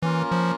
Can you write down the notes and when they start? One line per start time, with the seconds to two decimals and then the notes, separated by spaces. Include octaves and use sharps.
0.02 E3 A#3 C#4 F4 A#4
0.32 F3